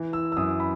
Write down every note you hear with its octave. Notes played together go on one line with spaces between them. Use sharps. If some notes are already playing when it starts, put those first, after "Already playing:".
Already playing: E3
E6
E6
F#2 D#6
B5